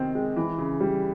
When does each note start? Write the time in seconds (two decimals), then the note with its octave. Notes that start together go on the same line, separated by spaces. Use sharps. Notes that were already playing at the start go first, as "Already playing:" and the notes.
Already playing: C3 D#3 C4
0.15 G#3
0.37 E3
0.58 C#3
0.81 G3